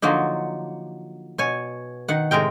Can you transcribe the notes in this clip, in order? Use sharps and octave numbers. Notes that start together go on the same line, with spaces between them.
D3 F3 F#3 A#3 D#4
B2 C#5 G#5
D#3 F#5
A2 C3 G#3 A#4 G5